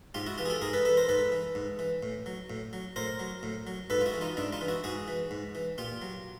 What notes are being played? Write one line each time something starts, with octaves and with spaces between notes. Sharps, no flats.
G#2 F4 G4
E4 F#4
E3 F4 G4
G#4
G4 A4
G#2 G#4 A#4
A4 B4
E3 A4 B4
A#4 C5
G#2 A4 B4
E3
G#2
E3
A2
F#3
A2
F#3
A2 A#4 C5
F#3
A2
F#3
G#2 A4 B4
F4
E4 F#4
E3
D#4 F4
G#2 D4 E4
D#4 F4
E3
E4 F#4
G#2 F#4 G#4
E3
G#2
E3
A#2 F4 G4
F#3